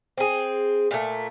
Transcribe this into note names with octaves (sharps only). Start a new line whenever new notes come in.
C4 G#4
A#2 A3